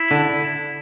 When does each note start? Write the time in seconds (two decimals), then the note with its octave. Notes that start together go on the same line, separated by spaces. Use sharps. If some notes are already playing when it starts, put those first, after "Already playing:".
Already playing: E4
0.11 D3